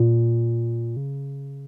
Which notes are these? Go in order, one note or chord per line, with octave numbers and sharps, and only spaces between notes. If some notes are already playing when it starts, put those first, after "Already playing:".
Already playing: A#2
C#3